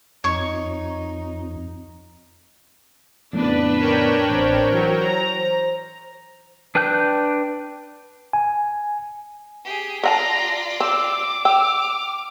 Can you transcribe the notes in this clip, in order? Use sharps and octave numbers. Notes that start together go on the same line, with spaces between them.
F2 D#4 C#5 C#6
F2 A2 C#3 B3 D4 B4
A#4 C#5 G5
A1 C4 C5
E3 F#3
A#5
C5
D4 B4 G5 F#6 G6
G#5
G4 G#4
F4 A4 D5 F#5 A5 A#5
C4 D6 E6
G5 E6 F6